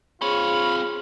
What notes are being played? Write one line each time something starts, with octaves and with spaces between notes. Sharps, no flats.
C4 F4 G#4 C#5 B5